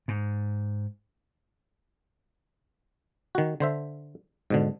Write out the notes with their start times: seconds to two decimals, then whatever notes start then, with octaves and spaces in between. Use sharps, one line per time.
0.08 G#2
3.35 D#3 F#4
3.60 D3 C5 E5
4.50 G#2 B2 D3